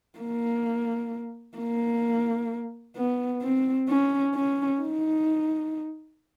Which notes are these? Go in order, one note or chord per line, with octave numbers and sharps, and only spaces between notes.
A#3
A#3
B3
C4
C#4
C#4
D#4